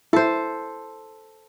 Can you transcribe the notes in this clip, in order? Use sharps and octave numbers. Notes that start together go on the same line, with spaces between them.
E4 A4 C5